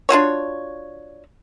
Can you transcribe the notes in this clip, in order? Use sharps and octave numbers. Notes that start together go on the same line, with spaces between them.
D4 F4 F#4 C#5